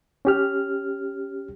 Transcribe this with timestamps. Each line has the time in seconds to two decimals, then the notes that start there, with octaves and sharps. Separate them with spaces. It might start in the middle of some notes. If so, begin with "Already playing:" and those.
0.25 C#4 G4 F6